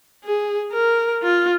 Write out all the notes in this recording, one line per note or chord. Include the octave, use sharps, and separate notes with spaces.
G#4
A#4
F4